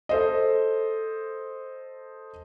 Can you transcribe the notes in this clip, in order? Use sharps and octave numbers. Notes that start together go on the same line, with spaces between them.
A4 C5 D#5